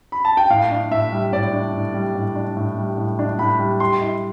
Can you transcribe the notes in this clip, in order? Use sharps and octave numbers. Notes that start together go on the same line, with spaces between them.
B5
A5
G5
A2 F5
D4
A2 E5
G3
A2 D5
D4
A2
G3
A2
D4
A2
G3
A2
D4
A2 B5
G3
G4 C6
E4